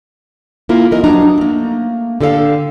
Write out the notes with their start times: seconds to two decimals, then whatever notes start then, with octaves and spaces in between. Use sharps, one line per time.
0.69 A#3 E4 F4 A#4
0.92 E3 A#3 D#4 A#4 D#5
1.03 F3 F#3 D4 D#4 A#5
1.38 A3 A#3
2.21 D3 G4 A4 D5 F5